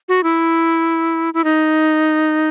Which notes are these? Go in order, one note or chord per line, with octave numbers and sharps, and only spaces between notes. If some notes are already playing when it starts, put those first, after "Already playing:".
F#4
E4
E4
D#4